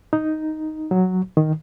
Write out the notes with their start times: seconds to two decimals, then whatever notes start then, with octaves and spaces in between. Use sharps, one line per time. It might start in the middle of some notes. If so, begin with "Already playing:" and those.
0.13 D#4
0.91 F#3
1.37 D#3